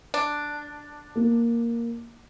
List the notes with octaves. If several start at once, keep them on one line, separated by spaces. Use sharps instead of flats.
D4
A#3